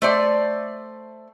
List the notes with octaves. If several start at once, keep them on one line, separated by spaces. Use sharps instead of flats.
A3 C5 D5